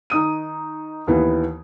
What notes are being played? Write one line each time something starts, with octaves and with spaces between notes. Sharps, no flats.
D#3 D#4 D#6 D#7
D#2 E3 B3